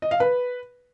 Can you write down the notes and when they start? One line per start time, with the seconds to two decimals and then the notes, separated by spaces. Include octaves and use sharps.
0.02 D#5
0.11 F5
0.20 B4